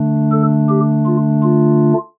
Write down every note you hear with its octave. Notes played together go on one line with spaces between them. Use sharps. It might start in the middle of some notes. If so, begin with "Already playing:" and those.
Already playing: D3 A3 D4
A4
G4
F4
F4